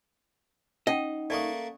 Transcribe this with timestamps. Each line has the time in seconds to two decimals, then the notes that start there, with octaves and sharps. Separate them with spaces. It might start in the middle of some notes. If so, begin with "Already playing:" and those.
0.87 C#4 D#4 D#5 F#5 G5
1.30 A3 A#3 D5 F#5 C#6 D#6